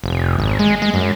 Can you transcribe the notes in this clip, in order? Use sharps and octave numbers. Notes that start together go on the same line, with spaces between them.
F1
G#1
G#3
G#3
F#2